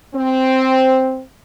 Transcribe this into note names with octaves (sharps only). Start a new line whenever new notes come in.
C4